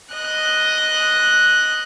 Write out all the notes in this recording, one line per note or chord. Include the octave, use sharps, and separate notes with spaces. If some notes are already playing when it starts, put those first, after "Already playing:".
D#5 F#6